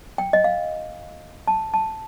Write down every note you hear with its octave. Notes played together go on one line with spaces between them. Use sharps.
G5
D#5
F5
A5
A5